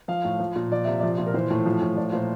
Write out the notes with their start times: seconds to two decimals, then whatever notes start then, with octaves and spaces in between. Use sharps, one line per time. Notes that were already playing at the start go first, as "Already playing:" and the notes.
0.08 F3 F5
0.25 A2
0.39 F3
0.56 A#2
0.71 F3 D5
0.85 C3 E5
1.00 F3 D5
1.18 A#2
1.27 A#4
1.34 E3 C5
1.50 A2
1.66 F3
1.82 A2
1.97 F3 D5
2.12 A#2 C5